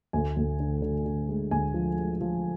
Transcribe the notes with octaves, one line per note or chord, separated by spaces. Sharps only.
D2 G#5
D2
D3
D3
D3
G#3
D2 G#5
F3
G#3
F3